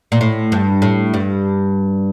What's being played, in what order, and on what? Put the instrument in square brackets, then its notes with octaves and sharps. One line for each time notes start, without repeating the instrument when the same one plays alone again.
[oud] A#2
A2
G2
A2
G2